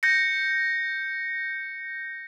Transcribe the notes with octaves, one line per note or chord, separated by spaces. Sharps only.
G6 A#6 C#7